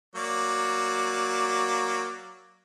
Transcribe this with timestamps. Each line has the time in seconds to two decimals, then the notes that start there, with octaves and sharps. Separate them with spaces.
0.15 F#3 A#3 D5